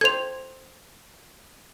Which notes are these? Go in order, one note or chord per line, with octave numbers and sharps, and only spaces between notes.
A4 C5 G#6 F7